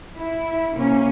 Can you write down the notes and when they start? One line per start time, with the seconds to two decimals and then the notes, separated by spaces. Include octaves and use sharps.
0.16 E4
0.74 C3 A#3 C#4